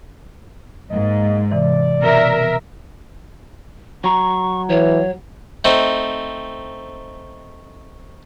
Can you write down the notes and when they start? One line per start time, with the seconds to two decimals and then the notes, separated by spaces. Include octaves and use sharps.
0.91 G#2 A#3 D#5
1.51 C3 E3 D5
2.01 B2 A#4 E5
4.04 F#3 A#5 C#6
4.69 E3 C#5
5.64 A3 C4 D#4